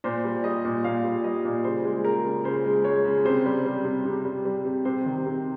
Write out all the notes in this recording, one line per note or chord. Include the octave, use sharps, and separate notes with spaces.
A#2 C5
G3
G3 D#5
A#2
A#2 F5
G3
G3 D#5
A#2
C#3 C5
G#3
G#3 A#4
C#3
C#3 C5
G#3
G#3 C#5
C#3
C3 C5
G3
G3
C3
C3
G3
G3
C3
C3 C5
D#3
C3